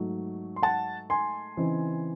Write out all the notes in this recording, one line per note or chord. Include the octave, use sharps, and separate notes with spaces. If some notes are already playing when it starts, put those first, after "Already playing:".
Already playing: G#2 F#3 A3 D#4
C6
F#5 A5
G#5 C6
C#3 E3 C4 D#4